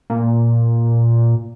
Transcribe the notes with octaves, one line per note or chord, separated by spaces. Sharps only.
A#2